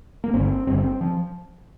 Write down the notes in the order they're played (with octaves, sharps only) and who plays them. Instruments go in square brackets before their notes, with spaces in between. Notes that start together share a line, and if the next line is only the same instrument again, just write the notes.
[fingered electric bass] A#3
G1 G2 D3 C4
G1 G2 D3 C4
C4
F3